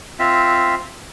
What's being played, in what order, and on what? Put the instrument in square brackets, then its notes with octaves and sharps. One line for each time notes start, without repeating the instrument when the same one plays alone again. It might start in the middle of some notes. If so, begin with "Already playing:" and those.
[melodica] C4 F4 E5